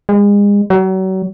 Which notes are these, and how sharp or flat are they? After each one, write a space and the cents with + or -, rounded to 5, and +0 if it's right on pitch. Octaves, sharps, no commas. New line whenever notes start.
G#3 -35
F#3 +35